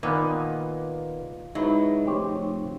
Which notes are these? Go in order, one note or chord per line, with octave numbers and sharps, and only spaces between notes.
A#2 D#3 B3 B4
G#2 F#3 D#4 E4 B4
F1 G4 C5 C#5